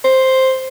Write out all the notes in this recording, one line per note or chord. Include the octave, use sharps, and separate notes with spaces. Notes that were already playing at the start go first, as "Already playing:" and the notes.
C5